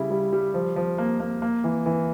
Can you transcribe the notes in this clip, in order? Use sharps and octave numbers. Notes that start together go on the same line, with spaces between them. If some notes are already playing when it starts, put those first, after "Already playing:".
Already playing: C#3 G3 E4
G3
G3
F3
F3
A#3
A#3
A#3
E3
E3